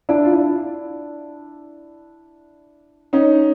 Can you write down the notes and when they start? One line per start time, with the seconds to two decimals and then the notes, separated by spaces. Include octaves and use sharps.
0.09 D4 E4
0.24 F4
0.31 D4 E4
3.13 C#4 D#4